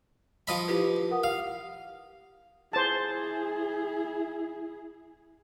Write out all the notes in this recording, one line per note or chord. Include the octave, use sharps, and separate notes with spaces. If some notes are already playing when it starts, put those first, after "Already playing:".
F3 D#5 B5
E4 F4 G4 B4
A#4 F#5 D#6
F5
E4 G#4 C5 A5